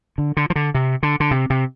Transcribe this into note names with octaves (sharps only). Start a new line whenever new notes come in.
D3
D3
F3
D3
C3
D3
D3
C3
C3